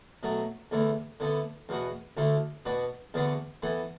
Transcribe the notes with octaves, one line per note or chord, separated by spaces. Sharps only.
B2 F#3 A3
E2 D3 A3 E4
D3 B3 E4 A4
E2 B2 B3 F#4
D2 D3 A3 E4
B2 B3 D4 F#4
E2 D3 B3 D4 F#4
E3 B3 E4 A4